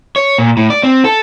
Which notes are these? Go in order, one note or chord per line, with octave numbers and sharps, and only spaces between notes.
C#5
A#2
A2
D5
C4
A4